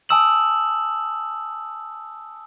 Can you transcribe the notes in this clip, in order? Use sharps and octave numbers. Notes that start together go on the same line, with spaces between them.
G#5 A5 D#6 E6 E7 F#7